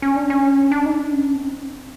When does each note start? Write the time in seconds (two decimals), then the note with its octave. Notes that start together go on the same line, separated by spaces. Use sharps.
0.02 C#4
0.16 D4
0.30 C#4
0.72 D4
0.86 D#4
0.99 D4
1.13 C#4
1.35 C4